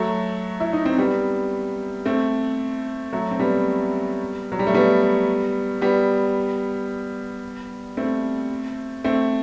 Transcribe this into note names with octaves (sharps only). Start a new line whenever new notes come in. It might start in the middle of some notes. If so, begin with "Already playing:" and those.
Already playing: F#3 A3
E4
D#4
C4
G3 B3
A3 C4
F#3 A3
C4
G3 B3
F#3
G3
A3
G3 B3
G3 B3
A3 C4
A3 C4